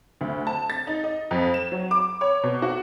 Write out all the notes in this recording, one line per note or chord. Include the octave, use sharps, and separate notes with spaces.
D2
A5
A6
D#4
D#5
F2
E7
F#3
D6
C#5
B2
F#4